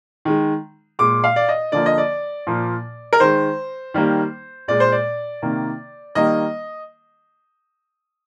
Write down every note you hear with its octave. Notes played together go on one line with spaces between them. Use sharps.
D#3 G#3
A#2 G#3 D6
F5
D5
D#5
D3 F3 A#3 D5
D#5
D5
A#2 F3 A#3
A#4
D#3 G#3 C5
D#3 G3 A#3
A#2 G#3 D5
C5
D5
C3 D#3 A#3
D#3 G3 A#3 D#5